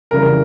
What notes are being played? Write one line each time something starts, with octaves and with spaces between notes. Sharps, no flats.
F2 C#3 E3 G3 A#4